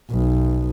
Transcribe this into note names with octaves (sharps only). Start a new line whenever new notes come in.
B1